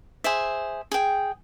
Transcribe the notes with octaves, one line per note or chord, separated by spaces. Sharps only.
G#4 C5 E5
G#4 G5